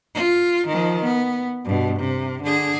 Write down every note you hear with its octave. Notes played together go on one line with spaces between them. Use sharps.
F4
D#3 F3
B3
G2 B2
C3
D3 G#4